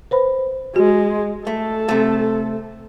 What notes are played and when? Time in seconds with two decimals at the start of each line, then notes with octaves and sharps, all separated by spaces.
0.11 B4 C5 B5
0.76 G#3 F#4
1.47 A3 A4
1.89 C3 A3